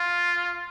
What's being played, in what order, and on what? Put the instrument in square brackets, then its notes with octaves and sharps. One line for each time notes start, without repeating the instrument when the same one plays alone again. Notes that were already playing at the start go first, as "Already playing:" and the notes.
Already playing: [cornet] F4